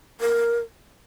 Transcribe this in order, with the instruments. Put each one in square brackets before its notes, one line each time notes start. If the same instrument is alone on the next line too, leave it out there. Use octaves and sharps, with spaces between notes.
[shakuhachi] A#4